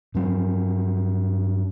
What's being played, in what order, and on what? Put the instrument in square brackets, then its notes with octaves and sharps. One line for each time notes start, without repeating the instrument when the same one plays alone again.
[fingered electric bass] G2 F#3 C4